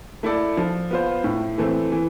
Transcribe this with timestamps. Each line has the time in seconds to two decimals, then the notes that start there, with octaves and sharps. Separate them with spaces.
0.23 A3 E4 A4 D5
0.57 F3
0.91 B3 F4 C5
1.24 A2
1.58 E3 A3 C4
1.92 E3